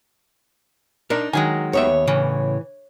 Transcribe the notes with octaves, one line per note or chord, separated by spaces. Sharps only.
D4 D#4 A#4
D#3 F#3 G#3 G#5
D#2 B3 C#5 E5
A2 C#3 E3